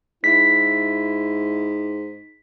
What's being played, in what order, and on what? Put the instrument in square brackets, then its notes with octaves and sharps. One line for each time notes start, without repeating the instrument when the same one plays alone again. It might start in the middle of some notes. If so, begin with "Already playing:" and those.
[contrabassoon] G#2 [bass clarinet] E4 [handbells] B6